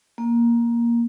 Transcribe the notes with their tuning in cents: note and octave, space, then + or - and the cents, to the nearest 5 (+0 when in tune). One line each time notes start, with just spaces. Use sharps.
A#3 +10